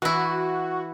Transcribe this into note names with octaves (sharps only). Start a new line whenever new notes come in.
E3 E4 F#4